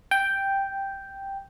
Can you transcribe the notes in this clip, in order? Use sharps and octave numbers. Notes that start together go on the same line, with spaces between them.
G5